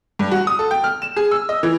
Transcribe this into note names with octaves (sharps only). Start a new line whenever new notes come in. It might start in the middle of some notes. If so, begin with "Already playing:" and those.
G2
F#4
D#6
A4
G5
F6
E7
G#4
E6
D#5
E3